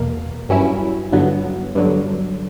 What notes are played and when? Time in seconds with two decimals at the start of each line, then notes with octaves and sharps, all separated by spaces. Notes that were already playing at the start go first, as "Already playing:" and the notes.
Already playing: E2 B2 A#3
0.49 G2 F#3 C#4 E4
1.12 G2 D3 F#3 B3
1.75 G2 D3 F#3